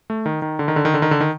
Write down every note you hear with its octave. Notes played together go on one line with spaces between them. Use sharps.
A3
D#3
D#3
D3
D#3
D3
D#3
D3
D#3
D3
D#3